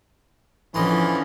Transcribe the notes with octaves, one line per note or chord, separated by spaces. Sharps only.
F2 D3 E3 C#4 D#5 C6